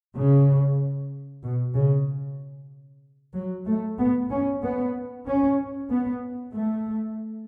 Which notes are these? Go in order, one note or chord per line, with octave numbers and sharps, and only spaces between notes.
C#3
B2
C#3
F#3
A3
B3
C#4
B3
C#4
B3
A3